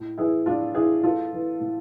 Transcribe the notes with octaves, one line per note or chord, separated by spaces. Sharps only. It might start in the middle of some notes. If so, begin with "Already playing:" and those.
Already playing: A2
E3 E4 G#4
A2 D4 F4
E3 E4 G#4
A2 F4 A4
E3
A2